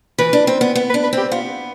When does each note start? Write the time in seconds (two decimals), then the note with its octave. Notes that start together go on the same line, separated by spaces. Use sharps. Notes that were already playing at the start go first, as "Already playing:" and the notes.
0.18 E3 B4
0.33 D4
0.47 C4
0.61 B3
0.76 B3
0.89 B4
0.94 D4
1.03 B4
1.13 C4 G4
1.31 B3 F4